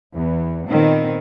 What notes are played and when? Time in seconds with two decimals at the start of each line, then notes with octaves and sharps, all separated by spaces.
0.15 E2
0.69 A#2 D#3 B3 C4